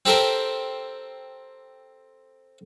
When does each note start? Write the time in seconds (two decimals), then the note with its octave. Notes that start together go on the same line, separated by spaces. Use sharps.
0.05 C4 G4 A4 A#4 C5